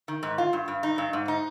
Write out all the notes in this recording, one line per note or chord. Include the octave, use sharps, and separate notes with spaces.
D#3
G#2
F4
G2
G2
D#4
G2
G#2
D#4